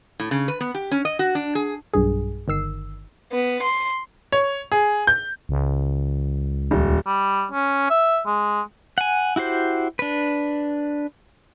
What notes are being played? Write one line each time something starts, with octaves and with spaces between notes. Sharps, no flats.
A2
C#3
B4
B3
G4
C#4
D#5
F#4
D4
G#4
B1 G2 G#4
G1 D#3 E6 C7
B3
C6
C#5
G#4
G6
C#2
D#1
G3
C#4
E5
G#3
F#5 G#5
E4 F#4 G4 C5
D4 B4